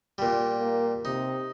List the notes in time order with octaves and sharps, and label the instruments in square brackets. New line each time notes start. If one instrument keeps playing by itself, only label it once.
[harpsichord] A#2 G3
[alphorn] A#3
[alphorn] C3 [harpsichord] D#4